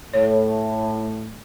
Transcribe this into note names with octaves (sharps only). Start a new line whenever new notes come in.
A2 C#5